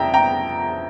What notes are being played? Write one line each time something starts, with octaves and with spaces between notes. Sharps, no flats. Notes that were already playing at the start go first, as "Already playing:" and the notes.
Already playing: F2 D4 E5 G5 A#5
G5 A#5